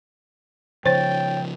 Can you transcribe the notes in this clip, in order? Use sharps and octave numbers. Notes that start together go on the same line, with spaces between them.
C#3 F3 C5 C#5 G5 A6